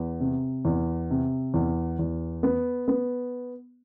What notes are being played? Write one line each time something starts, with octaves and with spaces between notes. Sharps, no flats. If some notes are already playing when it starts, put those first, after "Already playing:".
Already playing: E2
C3
E2
C3
E2
E2
B3
B3